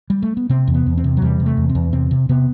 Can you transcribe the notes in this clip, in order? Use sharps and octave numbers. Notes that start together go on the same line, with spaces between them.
G3
A3
B3
C3 C4
E2
B3
E2
C4
C3
F#3
E2 G3
C3
A3
E2
C4
E2
C3 C4
C3
C3 B3